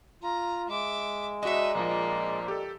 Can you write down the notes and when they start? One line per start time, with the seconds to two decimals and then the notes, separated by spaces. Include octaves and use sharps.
0.23 F4 A#5
0.68 G#3 E5 D6
1.43 D4 D#4 F#4 D#5 E5
1.75 A#1 F3 A#3
2.48 G4 A4